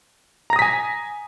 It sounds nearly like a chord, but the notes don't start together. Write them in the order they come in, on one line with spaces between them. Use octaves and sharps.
A#5 A#6 D#6 B6 G#5